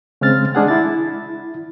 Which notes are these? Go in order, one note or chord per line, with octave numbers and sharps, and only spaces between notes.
C#3 G#3 C4 F6 A6
G#3 D4 G#4 F#5
E4 A6